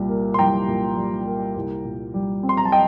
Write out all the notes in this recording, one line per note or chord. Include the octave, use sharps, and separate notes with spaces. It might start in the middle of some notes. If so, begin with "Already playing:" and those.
Already playing: C2 A#2 G3
A#3
C6
C2 G5 A#5
A#2
G3
A#3
C2
A#2
G3
C4
C6
A#5
A5
D#5 G5